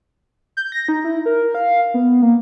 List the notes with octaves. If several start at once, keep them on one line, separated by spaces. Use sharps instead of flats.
G6
A#6
D#4
E4
A#4
F5
B3
A#3